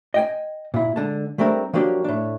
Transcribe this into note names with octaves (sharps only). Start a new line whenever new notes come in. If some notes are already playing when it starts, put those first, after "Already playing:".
D#5 G5 G#5
A#2 E4
D3 G#3 A5
G3 A3 C4 D4 A#4
F3 F#3 A#3 D4 G4
A2 D4